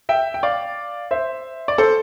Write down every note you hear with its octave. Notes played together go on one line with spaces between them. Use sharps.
E5 G5
G5
D5 F5
C5 E5
D5
A4 C5